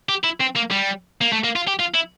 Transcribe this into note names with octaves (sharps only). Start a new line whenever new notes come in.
G4
E4
C4
A#3
G3
A#3
A3
A#3
F4
G4
F4
E4